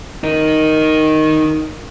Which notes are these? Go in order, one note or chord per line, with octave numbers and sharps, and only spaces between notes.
D#4 A#4